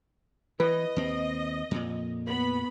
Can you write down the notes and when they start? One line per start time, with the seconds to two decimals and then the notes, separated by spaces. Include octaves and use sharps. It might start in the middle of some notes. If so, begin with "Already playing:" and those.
0.60 E3 B4 D#5
0.96 D#2 C4
1.71 F2 A#2
2.27 B3 B5